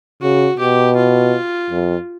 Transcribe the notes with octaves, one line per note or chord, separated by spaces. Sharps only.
C#3 F#4
B2 G4
F4
F2